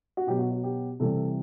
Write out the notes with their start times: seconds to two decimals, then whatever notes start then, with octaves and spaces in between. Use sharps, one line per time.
0.17 F#4
0.27 B2 F#3 G4
0.39 F#4
0.51 F#4
0.63 G4
1.00 C3 E3 G3 A4